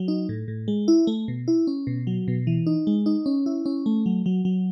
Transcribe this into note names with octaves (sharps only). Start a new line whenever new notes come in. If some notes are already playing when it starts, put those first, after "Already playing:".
Already playing: F#3
D#4
A2
A2
G#3
E4
A3
B2
E4
C#4
B2
F#3
B2
E3
D#4
G#3
D#4
C#4
E4
C#4
A3
F#3
F#3
F#3